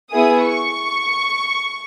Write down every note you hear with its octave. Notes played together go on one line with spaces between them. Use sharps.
B3 E4 G#4 D#6
C#6